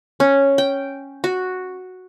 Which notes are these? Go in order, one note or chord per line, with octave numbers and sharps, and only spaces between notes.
C#4
G5
F#4